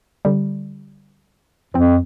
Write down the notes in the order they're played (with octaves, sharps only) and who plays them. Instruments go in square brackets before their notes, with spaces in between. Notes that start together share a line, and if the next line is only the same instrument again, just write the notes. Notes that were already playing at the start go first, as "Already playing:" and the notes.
[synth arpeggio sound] D3 G3
[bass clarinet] F2 [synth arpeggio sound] F3 C4